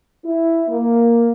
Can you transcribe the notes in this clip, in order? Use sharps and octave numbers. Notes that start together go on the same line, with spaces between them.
E4
A#3